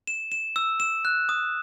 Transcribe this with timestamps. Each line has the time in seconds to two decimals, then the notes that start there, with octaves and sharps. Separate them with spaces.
0.07 E7
0.32 E7
0.56 E6
0.80 E7
1.05 F#6
1.29 D#6